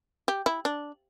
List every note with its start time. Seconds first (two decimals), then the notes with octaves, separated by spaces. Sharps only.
0.28 G4
0.46 E4
0.65 D4